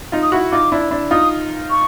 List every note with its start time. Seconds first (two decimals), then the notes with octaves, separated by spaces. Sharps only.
0.12 D#4 F4
0.22 D#6
0.32 E4 F#4
0.52 D#4 F4 D6
0.72 D4 E4
0.91 D4 E4
1.11 D#4 F4 D#6
1.70 C#6